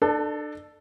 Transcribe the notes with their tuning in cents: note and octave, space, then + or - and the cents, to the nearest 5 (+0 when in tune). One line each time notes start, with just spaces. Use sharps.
D4 +30 A4 +0